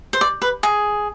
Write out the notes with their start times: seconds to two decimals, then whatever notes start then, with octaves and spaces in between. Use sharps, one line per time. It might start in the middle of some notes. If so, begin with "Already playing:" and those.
0.13 C5
0.21 D5
0.42 B4
0.63 G#4